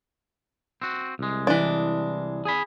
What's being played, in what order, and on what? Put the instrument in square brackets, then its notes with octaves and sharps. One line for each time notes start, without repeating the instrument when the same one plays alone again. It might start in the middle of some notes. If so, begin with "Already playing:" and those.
[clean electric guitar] C4 F#4
C2 G#3
[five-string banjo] E3 D4
[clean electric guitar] G#4 G#5 B5